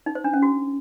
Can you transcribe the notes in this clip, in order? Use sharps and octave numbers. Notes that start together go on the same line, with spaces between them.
D#4
C5
D4
C#4
F#4